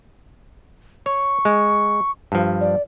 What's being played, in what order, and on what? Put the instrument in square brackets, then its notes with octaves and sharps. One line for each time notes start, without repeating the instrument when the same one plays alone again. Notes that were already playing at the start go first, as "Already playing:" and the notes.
[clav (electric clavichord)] C#5 [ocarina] C#6
[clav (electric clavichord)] G#3
G2 F3
[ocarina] D5